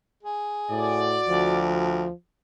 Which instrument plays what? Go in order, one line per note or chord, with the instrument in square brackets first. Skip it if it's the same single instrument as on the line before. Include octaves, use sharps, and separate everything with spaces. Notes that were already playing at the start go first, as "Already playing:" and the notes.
[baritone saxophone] G#4
[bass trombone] A2 [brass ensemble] F#4 D5
[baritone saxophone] D2 [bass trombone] F3